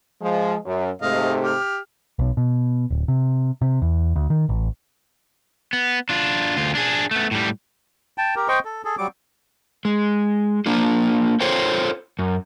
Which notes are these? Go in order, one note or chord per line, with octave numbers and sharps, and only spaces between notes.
F3 G#3
F#2
G#2 C3 A3 D#5 F5
G4 F6
B1
B2
D1
C3
C3
E2
D2
D#3
A1
B3
D4 F4
D2 F4
D4 G#4
A3 B3
A2 G3
G5 A5
G4 A#4
C5 D#5 G5 C#6
A4
G#4 A4
F#3 G3 D6
G#3
A#3 D4 F4
F4 A4 C5 C#5 G5
F#2